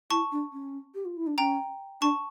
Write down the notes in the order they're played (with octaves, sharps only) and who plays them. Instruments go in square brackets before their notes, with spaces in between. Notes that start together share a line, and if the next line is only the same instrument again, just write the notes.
[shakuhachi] E4 [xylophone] A5 C#6
[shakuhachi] D4
C#4
G4
F4
E4
D4
[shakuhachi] C#4 [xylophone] G5 A#5
[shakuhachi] D4 [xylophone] A5 C#6